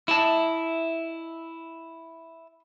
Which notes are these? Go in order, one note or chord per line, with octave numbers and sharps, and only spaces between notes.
E4 D#5 E5 A5 E6